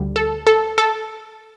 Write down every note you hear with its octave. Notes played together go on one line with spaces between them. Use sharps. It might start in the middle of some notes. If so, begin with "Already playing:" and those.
Already playing: D2 D3 G3
A4
A4
A4